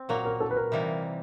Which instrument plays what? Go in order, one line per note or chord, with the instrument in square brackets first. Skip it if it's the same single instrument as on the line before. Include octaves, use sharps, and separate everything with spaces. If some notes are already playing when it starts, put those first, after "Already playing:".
Already playing: [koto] C4
[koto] A#2 F#3 A#3 [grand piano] A#4
[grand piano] A#4
A4
B4
A#4
[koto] C3 E3 G3 A#3 D#4